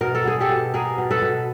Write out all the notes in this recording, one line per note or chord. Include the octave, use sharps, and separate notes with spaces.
B2 A#4
A4
B3 G#4
G4 A4
B2
B3 G#4 A#4
B2
A4 B4
B2